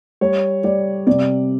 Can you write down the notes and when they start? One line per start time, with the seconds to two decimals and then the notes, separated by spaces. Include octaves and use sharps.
0.21 G3 C#5
0.64 G3 D5
1.07 C3 D5